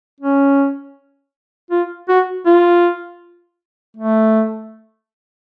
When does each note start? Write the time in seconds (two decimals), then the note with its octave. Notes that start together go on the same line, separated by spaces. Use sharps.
0.20 C#4
1.71 F4
2.09 F#4
2.45 F4
3.97 A3